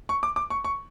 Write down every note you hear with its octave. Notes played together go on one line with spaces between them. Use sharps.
C#6
D6
D6
C#6
C#6